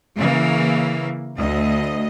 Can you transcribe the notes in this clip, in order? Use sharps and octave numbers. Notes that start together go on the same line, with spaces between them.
C#3 E3 A#3
D2 D#5